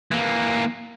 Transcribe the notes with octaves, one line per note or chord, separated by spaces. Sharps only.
E3 A#3